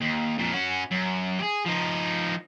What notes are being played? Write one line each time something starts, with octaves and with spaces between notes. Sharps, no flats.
D#2
F2 A#2
C#4 F#4
F#2
G4 G#4
F3 D#4